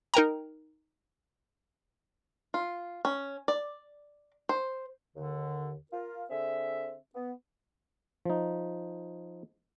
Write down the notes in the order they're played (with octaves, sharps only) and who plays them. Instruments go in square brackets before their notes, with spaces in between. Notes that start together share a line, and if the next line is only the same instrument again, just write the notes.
[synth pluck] D#4 A#4 G5 A#5
[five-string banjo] F4
C#4
D5
C5
[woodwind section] D#2 D3
F4 A#4
D3 C4 G#4 E5
B3
[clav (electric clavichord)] F3 D#4